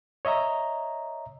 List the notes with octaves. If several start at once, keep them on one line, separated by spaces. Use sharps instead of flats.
C#5 D#5 E5 A#5